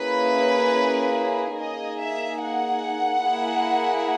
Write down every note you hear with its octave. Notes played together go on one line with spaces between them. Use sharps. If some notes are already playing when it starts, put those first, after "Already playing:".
Already playing: A#3 C#4 E4 G#4 B4
A#3 D#4 G#4 D#5
E5
F#5
A#3 E4 G#4